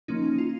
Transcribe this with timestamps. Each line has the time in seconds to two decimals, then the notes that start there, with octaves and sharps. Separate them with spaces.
0.08 F3 A#3 C#4 D#4
0.38 F4